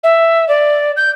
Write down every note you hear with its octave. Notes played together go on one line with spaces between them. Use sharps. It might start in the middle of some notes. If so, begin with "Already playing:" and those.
E5
D5
G6